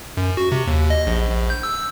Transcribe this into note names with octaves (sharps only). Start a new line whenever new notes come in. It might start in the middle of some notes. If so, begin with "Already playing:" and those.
F#2
F#4
C3
D#2
D#5
A#1
A#1
G6
E6